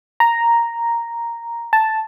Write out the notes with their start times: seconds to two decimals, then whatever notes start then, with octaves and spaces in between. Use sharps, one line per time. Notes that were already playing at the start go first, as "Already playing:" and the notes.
0.20 A#5
1.73 A5